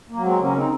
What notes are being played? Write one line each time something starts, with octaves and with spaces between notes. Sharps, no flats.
A#3
F#3
G#3 C4
C#3 A#3 C#4
C4 D#4